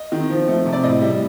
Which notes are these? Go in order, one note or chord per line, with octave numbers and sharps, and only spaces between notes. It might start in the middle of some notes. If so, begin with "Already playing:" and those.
Already playing: D#5
D#3
F3
A3
C3
D5
A2 D#5
G3